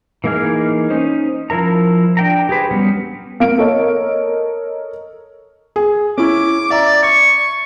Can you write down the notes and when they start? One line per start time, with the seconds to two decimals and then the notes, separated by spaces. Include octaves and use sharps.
0.24 E3 A#3 D#4 G#4 F6
0.90 C#4 D#4 C5
1.50 F3 E4 A#4 A#5
2.17 D4 G5 A#5
2.49 G4 G#4 B4 C5
2.71 F#3 G3 B3 C#4
3.40 A#3 F5 D7
3.58 A4 A#4 C#5 D#5
5.76 G#4
6.18 C#4 E4 D6
6.70 D5 E5 A#5
7.03 C#6 G#6